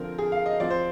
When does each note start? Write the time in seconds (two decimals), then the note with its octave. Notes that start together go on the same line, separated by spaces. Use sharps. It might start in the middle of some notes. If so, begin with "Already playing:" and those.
Already playing: D3 F3 C4 A#4
0.19 G#4
0.32 F5
0.46 D#5
0.60 F3 C4 F4 D5
0.70 C5